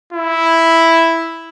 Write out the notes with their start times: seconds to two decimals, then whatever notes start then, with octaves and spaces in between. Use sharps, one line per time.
0.13 E4